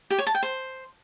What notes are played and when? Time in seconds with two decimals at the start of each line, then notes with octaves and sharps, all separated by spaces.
0.10 G4
0.19 C#5
0.27 A5
0.35 G5
0.43 C5